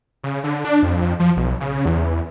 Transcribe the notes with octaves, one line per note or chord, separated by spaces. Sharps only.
C#3
D3
D4
F2
F2
F3
B1
C#3
E2